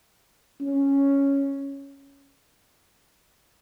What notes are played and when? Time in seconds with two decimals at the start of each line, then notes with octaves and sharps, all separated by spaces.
0.61 C#4